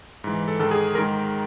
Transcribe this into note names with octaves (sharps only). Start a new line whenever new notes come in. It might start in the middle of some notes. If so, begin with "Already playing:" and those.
G#2 E3
A4
G#2 D#3 A4
G#4
G#2 D#3 A#4